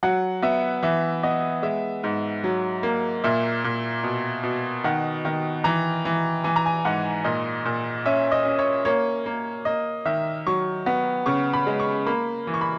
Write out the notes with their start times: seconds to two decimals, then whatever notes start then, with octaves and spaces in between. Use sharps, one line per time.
0.03 F#3 F#5
0.42 B3 E5
0.83 E3 E5
1.23 B3 D#5
1.62 G#3 E5
2.04 G#2
2.44 F#3
2.83 A#3
3.24 A#2 E5
3.64 A#2
4.03 B2
4.43 B2
4.84 D#3 F#5
5.25 D#3
5.64 E3 A#5
6.05 E3
6.44 E3 G#5
6.56 A#5
6.66 G#5
6.85 G#2 F#5
7.24 A#2 D#5
7.65 A#2
8.05 C#4 E5
8.32 D#5
8.45 C#4
8.59 C#5
8.85 A#3 C#5
9.26 A#3
9.65 A#3 D#5
10.06 D#3 E5
10.47 F#3 C#6
10.86 B3
11.26 C#3 C#6
11.53 B5
11.67 G#3
11.80 C#6
12.06 A#3 B5
12.47 E3
12.54 C#6
12.61 B5